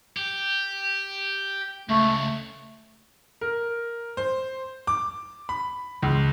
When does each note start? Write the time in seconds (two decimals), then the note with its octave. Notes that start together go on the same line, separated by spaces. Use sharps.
0.17 G4
1.89 C#2 A3
3.41 A#4
4.17 C5
4.87 D6
5.49 B5
6.02 C#2